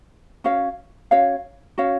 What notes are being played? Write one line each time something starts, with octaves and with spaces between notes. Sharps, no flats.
C#4 F#4 C#5 F5
C#4 F#4 C#5 F5
C#4 F#4 C#5 F5